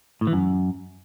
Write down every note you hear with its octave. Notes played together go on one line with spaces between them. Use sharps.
A2
E3
F#2